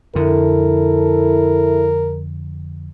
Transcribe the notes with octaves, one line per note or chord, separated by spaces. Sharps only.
F2 D3 E4 A4 A#4